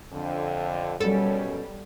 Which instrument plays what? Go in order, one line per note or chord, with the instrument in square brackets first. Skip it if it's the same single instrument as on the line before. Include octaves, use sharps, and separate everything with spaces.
[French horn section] F2 D3
[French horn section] F#2 B2 C#4 [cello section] G3 [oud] A4